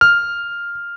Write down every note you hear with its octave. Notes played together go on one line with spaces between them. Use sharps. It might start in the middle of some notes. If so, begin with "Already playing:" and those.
F6